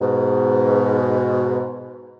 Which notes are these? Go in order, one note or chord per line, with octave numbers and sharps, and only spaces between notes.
G#2 B2